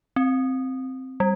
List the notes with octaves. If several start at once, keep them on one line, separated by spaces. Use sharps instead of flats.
C4
G3